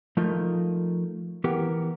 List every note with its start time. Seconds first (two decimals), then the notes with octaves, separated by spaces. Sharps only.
0.17 F3 A3 D#4 F4 A#4 D#5
1.44 E3 B3 G4 A#4